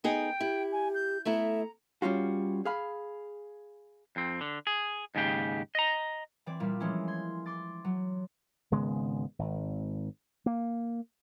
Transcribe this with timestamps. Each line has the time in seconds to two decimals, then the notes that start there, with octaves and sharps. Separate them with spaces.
0.04 B3 D#4 G#4 G5
0.41 E4 G4
0.72 G#5
0.94 G6
1.25 A3 B3 E4 E5 A#5
2.02 G3 C#4 F4 F#4
2.65 G#4 F5 B5
4.16 F2 C4
4.41 D3
4.67 G#4
5.15 D#2 G#2 C#3 G4
5.75 D#5 A#5
6.46 E3 C4 D5
6.60 A#2 G3 E4 F4
6.80 E3 F3 G#3 A#3 C#4 E4
7.08 C6 G#6
7.46 C6 D6 A6
7.85 F#3
8.71 G#1 C#3 G#3 B3
9.39 G#1
10.46 A#3